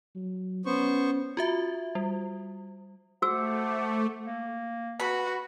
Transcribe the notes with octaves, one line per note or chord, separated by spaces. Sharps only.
F#3
B3 C#4 C5 C#6
F4 F#4 E5
G3
A3 F#4 C5 F#5 D6 E6
A#3
F#4 B4 B5